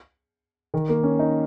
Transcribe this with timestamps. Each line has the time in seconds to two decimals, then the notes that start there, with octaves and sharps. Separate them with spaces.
0.74 D#3
0.89 A#3
1.03 C#4
1.19 D#4